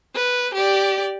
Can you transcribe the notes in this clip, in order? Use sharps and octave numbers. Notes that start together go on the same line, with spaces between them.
B4
G4 D5